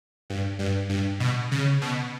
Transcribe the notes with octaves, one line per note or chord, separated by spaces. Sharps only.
G2
G2
G2
B2
C#3
B2